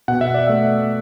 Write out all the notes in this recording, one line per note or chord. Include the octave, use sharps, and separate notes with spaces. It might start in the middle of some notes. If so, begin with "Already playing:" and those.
B2 F#5
E5
D5
A3 E5